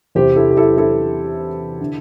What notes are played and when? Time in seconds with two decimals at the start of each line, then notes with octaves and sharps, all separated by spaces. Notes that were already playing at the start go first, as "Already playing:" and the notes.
0.15 E2 C3 E3 G4 C5
0.36 E4 A4
0.51 G4
0.57 E4 A4
0.77 E4 A4
1.80 D3